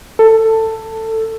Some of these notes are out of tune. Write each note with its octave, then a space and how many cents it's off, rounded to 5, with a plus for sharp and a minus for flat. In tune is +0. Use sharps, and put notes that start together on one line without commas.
A4 +15